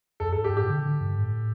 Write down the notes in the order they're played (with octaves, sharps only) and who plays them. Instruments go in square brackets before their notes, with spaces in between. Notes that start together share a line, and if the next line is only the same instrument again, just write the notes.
[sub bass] F2 [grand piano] A4
[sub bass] G2 [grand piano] A4
[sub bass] G2 [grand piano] G4
[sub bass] A2 [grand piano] G4
[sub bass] D3
D3
G2
A2